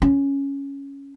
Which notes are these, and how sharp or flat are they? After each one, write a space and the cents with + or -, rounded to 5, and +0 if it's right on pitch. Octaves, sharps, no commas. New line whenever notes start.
C#4 +0